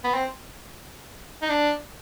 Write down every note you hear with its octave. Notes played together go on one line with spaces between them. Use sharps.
B3
C4
D#4
D4